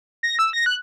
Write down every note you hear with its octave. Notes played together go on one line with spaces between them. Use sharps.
A#6
E6
A#6
F#6